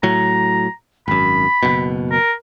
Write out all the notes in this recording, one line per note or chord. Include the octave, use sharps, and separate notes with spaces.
A2 F#3 A#5
G#1 F#2 B5
F#1 B2
A#4